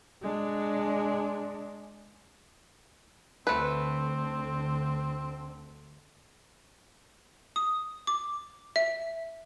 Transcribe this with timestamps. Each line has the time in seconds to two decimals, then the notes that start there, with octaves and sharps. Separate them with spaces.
0.22 G#3 D4
3.47 D2 D3 A3 C4 B4
7.56 D#6
8.07 D6
8.76 E5